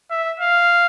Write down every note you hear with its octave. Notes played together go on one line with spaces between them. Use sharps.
E5
F5